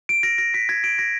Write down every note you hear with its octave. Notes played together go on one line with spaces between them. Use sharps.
D7
A#6
A#6
B6
G#6
D7
A#6